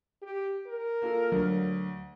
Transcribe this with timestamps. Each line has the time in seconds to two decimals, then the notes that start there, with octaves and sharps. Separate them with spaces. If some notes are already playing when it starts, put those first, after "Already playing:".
0.22 G4
0.67 A#4
1.02 A#3 F4 A4
1.32 D2 F#3